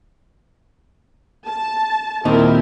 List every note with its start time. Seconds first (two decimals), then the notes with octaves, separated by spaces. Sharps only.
1.46 A5
2.25 D#2 A#2 C4 D#4 E4 A#4